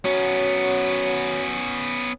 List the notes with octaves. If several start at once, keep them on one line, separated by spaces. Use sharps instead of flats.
F#3 B3 C#4